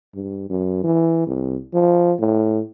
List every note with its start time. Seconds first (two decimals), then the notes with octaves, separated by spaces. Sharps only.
0.15 G2
0.50 F#2
0.83 E3
1.27 C2
1.74 F3
2.19 A2